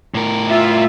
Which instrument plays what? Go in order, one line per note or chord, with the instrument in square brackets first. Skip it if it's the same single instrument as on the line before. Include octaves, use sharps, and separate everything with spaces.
[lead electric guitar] A2 A#4
[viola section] F4 E5